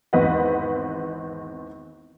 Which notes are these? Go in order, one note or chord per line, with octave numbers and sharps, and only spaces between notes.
G#1 E2 C4 B4 D#5 F#5